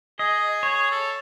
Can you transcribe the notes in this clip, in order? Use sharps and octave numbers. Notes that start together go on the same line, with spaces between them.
G#4 D#5
C#5
A4